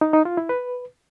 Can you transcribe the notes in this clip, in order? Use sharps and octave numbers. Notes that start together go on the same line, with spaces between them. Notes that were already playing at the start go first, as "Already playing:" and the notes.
D#4
D#4
F4
E4
B4